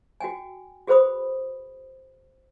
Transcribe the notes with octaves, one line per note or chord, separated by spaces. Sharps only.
F#4 G5 G#5
F#4 G#4 B4 C5 B5 D#6